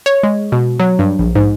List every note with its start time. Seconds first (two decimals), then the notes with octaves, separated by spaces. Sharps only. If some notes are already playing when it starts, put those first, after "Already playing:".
0.06 C#5
0.23 G#3
0.52 B2
0.80 F#3
0.99 G2
1.19 A#1
1.35 G#2